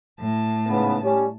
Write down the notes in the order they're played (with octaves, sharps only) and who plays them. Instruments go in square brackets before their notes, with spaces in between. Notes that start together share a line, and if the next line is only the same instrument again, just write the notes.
[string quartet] A2 A5
[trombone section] G#2 C#3 B3
G3 C#4